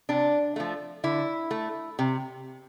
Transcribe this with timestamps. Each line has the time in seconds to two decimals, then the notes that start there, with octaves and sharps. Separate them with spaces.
0.09 C3 D4
0.56 F3 A3
1.04 D3 E4
1.51 A3
1.99 C3